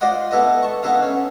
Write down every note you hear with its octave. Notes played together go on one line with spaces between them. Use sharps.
F4 C5 D5 D#5 F#5 B5
B3 E4 A4 B4 D#5
A5 C#6
B3 D#4 E4 A4 B4 F5
C#4